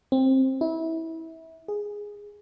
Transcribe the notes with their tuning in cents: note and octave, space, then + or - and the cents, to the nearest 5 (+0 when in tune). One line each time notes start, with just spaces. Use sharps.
C4 +15
E4 -25
G#4 -5